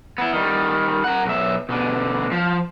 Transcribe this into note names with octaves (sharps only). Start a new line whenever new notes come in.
B3 E4
D#3 G3
A#4 F#5
B1 E5
B2 D3
F3